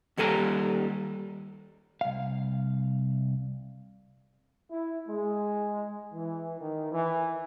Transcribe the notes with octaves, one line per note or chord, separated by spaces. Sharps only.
D#2 G3 A4 G#5 A#5
C2 F5
E4
G#3
E3
D#3
E3